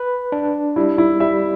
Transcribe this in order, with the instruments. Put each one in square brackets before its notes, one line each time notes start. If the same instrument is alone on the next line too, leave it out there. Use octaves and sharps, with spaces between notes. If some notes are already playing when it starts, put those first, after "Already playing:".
Already playing: [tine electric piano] B4
D4
[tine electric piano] G3 [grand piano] E4
[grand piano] E4
[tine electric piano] G3 [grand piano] E5